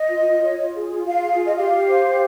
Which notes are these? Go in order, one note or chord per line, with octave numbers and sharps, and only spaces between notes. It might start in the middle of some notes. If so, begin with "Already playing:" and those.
Already playing: D#5
F4
F4
C#5
F4
G#4
F4
F4 F5
G#4
F4
D#5
G4 F5
G4
C5
G4